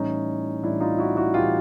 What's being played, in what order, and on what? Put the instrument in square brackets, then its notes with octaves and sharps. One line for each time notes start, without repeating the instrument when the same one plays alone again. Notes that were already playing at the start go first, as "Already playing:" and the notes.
Already playing: [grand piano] A2 E3 G3 C#4 D#4
A2 E3 G3 D4 E4
D#4 F4
E4 F#4
E4 F#4
A2 E3 G3 F4 G4